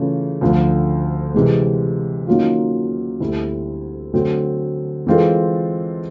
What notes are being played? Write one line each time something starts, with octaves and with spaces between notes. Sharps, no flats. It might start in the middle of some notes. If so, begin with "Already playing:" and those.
Already playing: C#3 E3 A3 C#4 F4
D2 D3 F3
C3 E3 G#3
D#3 F#3 A#3 C#4 F4
D2 D3 G3 C4 E4
D3 F#3 A3 C4
E3 G#3 C4 F4 A4